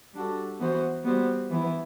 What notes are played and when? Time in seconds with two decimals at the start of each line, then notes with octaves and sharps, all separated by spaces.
0.14 G3 D4 F#4 A4
0.59 E3 B3 F#4 C5
1.04 G3 B3 F#4 C5
1.49 E3 B3 E4